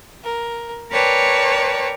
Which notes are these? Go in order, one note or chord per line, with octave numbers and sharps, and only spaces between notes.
A#4
A#4 B4 C#5 D5 G5 A5